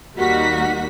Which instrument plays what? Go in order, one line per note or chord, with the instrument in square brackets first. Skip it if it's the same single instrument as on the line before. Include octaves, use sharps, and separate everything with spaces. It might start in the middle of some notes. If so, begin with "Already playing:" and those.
[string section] D#2 G3 A#3 D#4 F#4 B6